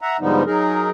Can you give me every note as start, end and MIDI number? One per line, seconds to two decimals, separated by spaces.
0.01 0.17 76
0.01 0.17 78
0.01 0.17 82
0.20 0.43 44
0.20 0.43 50
0.20 0.43 53
0.20 0.43 55
0.20 0.43 59
0.20 0.43 63
0.46 0.90 54
0.46 0.90 63
0.46 0.90 68
0.46 0.90 70